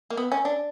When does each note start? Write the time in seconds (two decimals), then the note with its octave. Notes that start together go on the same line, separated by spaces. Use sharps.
0.10 A#3
0.17 B3
0.32 C#4
0.45 D4